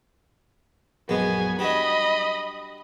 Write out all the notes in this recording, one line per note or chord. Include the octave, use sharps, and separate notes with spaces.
A#1 F#2 G#3 B3 G#5
G3 D4 F#4 D#5 B5